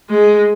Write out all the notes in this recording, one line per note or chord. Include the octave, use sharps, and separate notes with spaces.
G#3